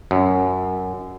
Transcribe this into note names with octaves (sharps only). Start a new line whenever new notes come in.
F#2